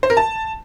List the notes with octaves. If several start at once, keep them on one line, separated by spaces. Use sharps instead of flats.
C5
A#4
A5